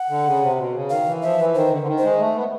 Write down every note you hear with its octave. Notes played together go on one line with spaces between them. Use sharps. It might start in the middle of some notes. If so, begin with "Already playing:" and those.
Already playing: F#5
D3
C#3
C3
B2
C#3
D#3 F5
E3
F3 E5
E3
D#3 C5
D3
D3
D#3
C5
G#3
A3
B3